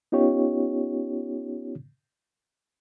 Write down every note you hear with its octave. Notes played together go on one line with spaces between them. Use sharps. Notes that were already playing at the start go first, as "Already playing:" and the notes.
B3 C#4 D#4 F4 G4 C#5